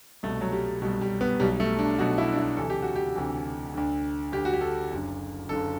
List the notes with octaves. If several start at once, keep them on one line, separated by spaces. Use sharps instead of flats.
C2 B2 A3
F#3
G3
C2 B2 G3
G3
B3
B1 B2 G3
A3
D4
B1 B2 F#4
E4
D4
E4
D2 C3 E3 A4
G4
F#4
G4
D2 C3 E3
D2 D3
D2 D3 G4
F#4
G4
A4
F#1 F#2 D3
F#1 F#2 D3 A4